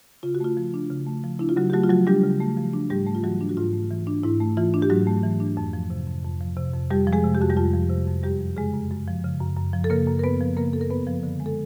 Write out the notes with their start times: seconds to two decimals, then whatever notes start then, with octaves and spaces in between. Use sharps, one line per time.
0.23 C#3 F4
0.35 F#4
0.40 A3 F4
0.57 F3
0.74 D4
0.90 C#3
1.07 A3
1.24 F3
1.39 D4 E4
1.49 F4
1.56 C#3 F#3 F#4
1.70 G4
1.73 F#3 A3 F#4
1.83 F4
1.90 F3 F#3 F#4
2.07 G3 D4 G4
2.24 C#3
2.40 A3
2.57 F3
2.73 D4
2.90 G#2 G3 G4
3.07 A3
3.15 F4
3.23 E3 F#3 F#4
3.41 D4
3.49 F#4
3.57 G#2 F4
3.73 A3
3.91 E3
4.07 D4
4.23 G#2 E4
4.41 A3
4.57 E3 F4
4.74 D4
4.82 G4
4.90 G#2 F#3 F#4
5.07 A3
5.23 E3
5.40 D4
5.57 F2
5.73 F3
5.90 C3
6.07 F2
6.24 F2
6.41 F3
6.57 C3
6.74 F2
6.90 F2 G3 G4
7.07 F3
7.13 G#3 G#4
7.24 C3
7.35 G4
7.41 F2 F#4
7.50 G3 G4
7.57 F2 F4
7.73 F3
7.90 C3
8.07 F2
8.23 F#2 G3 G4
8.40 F3
8.56 C#3 G#3 G#4
8.73 F#2
8.90 F#2
9.08 F3
9.24 C#3
9.40 F#2
9.57 F#2
9.73 F3
9.84 A4
9.90 C#3 A#3 A#4
10.07 F#2
10.19 A#4
10.24 F#2 B3 B4
10.41 F3
10.57 C#3 A#3 A#4
10.73 F#2 A4
10.81 A#4
10.90 G2 B3 B4
11.07 F3
11.23 D3
11.40 G#3
11.46 A4